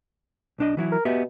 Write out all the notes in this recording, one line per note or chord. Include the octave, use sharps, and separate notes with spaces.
B1 D4 D#5
E3 F#3 E4
A#4
B2 B3 G4 E5